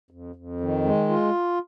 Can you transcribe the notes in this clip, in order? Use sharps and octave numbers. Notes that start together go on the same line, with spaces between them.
F2
F2
D#3
G#3
F4